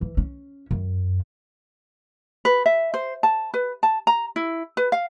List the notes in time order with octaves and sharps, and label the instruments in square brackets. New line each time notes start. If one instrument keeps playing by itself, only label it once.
[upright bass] E3
C#4
F#2
[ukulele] B4
E5
C5
A5
B4
A5
A#5
E4
B4
F5